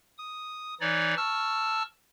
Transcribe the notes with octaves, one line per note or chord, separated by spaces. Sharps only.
D#6
E3 D#4 C#5 D5
A5 C#6 E6 F6